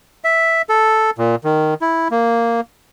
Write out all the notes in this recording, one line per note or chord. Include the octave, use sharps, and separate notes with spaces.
E5
A4
A#2
D#3
E4
A#3